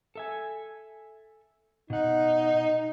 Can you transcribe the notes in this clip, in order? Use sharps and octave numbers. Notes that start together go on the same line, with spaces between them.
A4 E5 G#5
B2 D#4 F#5